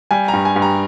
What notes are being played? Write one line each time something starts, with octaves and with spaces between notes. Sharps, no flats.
G3 G#5
A#5
G2
G#5
G2
A#5